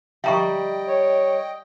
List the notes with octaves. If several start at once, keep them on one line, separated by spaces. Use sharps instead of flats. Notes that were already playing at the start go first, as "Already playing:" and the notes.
G3 D#5 E5 G5 A#5 C#6
C#5